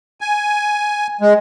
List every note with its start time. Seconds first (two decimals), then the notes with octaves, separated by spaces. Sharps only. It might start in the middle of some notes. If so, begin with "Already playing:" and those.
0.21 G#5
1.21 G#3